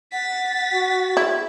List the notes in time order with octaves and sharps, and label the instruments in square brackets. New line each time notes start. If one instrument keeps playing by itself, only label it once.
[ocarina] F#5 [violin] A6 B6
[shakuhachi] F#4
[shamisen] E4 [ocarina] G#4